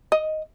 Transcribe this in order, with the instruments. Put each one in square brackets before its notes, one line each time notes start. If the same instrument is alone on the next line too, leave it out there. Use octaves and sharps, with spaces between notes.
[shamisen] D#5